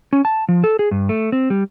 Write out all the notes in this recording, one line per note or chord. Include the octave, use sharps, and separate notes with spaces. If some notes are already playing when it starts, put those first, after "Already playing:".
C#4
A5
F3
A4
G#4
G2
A3
C4
G3